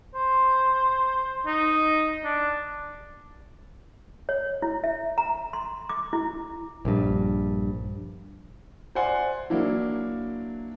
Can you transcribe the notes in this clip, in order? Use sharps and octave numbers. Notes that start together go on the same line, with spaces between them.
C5
D#4
D4
C#5
E4
E5
A#5
C6
D6
E4
A#1 G2
C5 D5 E5 F#5 G#5 C6
F#3 A#3 D4 E4